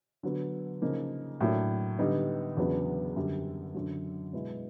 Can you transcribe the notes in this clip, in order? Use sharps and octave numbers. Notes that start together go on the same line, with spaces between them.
D3 F#3 B3
C#3 F3 A#3 D#4
A2 F#3 A#3 D4
D3 G3 B3 D#4
E2 C#3 F#3 B3 D4
F#2 D3 G3
F#2 D3 F#3
B2 G#3 B3 E4